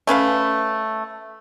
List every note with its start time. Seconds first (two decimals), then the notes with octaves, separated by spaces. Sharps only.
0.07 A3 C#4 B4 F5